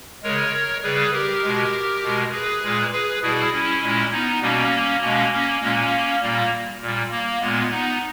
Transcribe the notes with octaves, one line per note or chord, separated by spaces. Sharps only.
C#3 G#3 A#4 C#5
C#3 G3 G#4 B4
G4 A#4
B2 G#3
B2 G#3
G#4 B4
A#2 G#3
G#4 B4
B2 G3 E4 G#4
C#4 E4
A#2 G#3
B3 D#4
B2 G3 A#3 C#4
B2 G#3 A#3 C#4
A#3 C#4
A#2 G#3 A#3 C#4
A#2 G3 A#3
A#2 G3
A#3
A#2 G#3 B3
B3 D#4